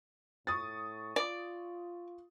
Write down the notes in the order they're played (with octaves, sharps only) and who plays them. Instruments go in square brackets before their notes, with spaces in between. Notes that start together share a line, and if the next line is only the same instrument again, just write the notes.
[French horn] A2 [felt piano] C#6 D#6 A6
[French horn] F4 [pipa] D5